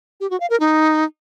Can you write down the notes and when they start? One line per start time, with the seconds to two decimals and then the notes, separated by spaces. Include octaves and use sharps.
0.20 G4
0.30 F#4
0.40 F5
0.50 A#4
0.60 D#4